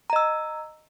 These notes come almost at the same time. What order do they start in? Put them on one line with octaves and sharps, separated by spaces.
A#5 D#5 E6